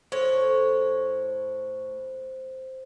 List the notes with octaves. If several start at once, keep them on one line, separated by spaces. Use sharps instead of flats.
A2 C5 C#5